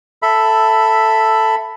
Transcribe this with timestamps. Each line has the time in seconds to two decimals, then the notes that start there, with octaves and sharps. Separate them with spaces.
0.23 A4 E5 B5